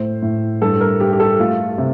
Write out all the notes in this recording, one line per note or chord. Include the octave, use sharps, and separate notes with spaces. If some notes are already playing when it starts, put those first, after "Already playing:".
Already playing: A2 A3 C5
A2
G2 A4
A#4
G2 G4
G4
A4
A3 F4
C3